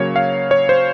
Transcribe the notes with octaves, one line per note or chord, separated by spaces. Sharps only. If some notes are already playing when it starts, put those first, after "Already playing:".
Already playing: C#3 F#3 A#3 C#5
F5
C#5
C5